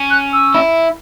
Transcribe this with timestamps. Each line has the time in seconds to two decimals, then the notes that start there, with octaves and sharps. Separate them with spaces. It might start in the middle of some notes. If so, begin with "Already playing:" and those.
Already playing: C#4
0.11 F#6
0.33 E6
0.54 E4